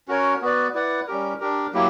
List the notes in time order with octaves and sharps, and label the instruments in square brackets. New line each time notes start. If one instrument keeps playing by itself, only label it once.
[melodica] C#4 F#4 A#4 C#5
B3 F#4 B4 D5
E4 B4 D5 F#5
G3 C#4 G4 A#4
D4 G4 A#4
F#3 A#3 E4 G4